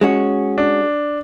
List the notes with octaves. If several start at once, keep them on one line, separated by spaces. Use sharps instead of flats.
G#3 C#4 F#4
D4